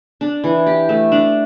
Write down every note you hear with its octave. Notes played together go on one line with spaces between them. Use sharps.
D4
E3
G4
A3
D4